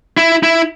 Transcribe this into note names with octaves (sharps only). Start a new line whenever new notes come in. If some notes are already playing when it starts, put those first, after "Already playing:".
E4
E4